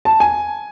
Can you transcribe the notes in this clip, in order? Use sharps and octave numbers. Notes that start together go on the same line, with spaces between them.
A5
G#5